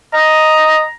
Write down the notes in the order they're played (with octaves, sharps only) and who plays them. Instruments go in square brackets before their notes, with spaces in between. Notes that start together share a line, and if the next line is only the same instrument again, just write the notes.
[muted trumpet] D#5 [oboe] A#5